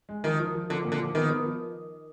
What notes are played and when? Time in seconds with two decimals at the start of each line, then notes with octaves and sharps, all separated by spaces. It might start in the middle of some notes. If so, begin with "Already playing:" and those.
0.09 G#3
0.24 D#3 F3
0.39 F3
0.55 F3
0.70 D3 F3
0.85 A#2
0.92 D3
0.99 F3
1.15 D#3 B3
1.31 B3
1.46 F3